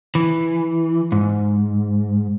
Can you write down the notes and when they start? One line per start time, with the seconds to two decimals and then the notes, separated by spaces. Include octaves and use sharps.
0.15 E3
1.12 G#2